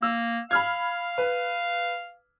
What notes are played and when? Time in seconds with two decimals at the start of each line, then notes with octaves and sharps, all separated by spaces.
0.02 A#3 E6
0.51 F5 B5 F6 G#6
1.18 B4